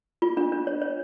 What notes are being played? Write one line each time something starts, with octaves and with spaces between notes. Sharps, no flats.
F4
D4
D4
C#5
C#5